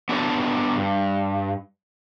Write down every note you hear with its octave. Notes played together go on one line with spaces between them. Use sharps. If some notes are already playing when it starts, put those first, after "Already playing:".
B3 D4 A4 C#5
G2